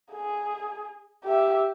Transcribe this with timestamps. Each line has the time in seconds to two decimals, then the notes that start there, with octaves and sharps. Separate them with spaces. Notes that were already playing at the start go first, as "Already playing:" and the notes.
0.13 G#4
1.24 G4 E5